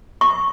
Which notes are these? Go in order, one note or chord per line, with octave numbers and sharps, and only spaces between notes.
C#6